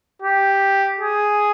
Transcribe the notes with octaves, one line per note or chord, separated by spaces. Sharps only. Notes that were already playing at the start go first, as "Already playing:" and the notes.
G4
G#4